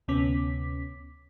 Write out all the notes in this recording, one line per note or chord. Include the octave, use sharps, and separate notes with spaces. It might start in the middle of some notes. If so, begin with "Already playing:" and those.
D2 C3 B3 C#4 D6 B6